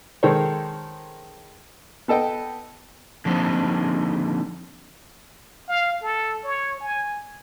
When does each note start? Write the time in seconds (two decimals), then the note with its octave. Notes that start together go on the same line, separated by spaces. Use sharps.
0.23 D#3 G#3 A4 A#4 C5 C#5
2.08 B3 A4 D#5 G5
3.25 D3 F3 G3 A#3 C4 D#4
5.69 F5
6.02 A4
6.44 C#5
6.81 G#5